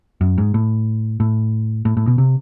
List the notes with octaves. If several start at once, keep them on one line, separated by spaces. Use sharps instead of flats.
F#2
G#2
A2
A2
A2
A2
B2
C3